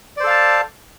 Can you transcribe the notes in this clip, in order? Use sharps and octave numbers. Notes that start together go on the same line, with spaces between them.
A4 C5 D5 F5 A5